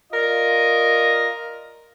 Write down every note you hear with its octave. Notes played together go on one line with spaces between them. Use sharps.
F4 A#4 D5 D#5